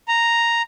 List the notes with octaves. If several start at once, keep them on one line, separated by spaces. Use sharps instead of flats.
A#5